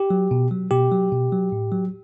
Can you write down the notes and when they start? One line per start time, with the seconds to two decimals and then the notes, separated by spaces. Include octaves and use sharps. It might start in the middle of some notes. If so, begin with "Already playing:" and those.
Already playing: G4
0.10 F#3
0.31 B2
0.51 F#3
0.71 B2 G4
0.92 F#3
1.12 B2
1.32 F#3
1.52 A2
1.72 F#3